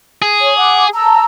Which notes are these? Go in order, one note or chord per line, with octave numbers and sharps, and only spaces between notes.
G#4
C#5
F#5 D6
A5 A#5 E6